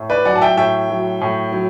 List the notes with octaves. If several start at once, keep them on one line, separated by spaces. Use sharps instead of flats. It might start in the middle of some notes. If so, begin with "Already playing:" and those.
Already playing: A2
B4 D5
F#3 D5 F#5
A5
E5 G5
A2 E5 G5
F#3
A2
F#3